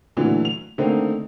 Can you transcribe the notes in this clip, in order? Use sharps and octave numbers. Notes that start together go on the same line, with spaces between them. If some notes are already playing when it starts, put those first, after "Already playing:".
A#2 D3 E3 F#3 A3
F7
D3 D#3 A3 A#3 C4 D#4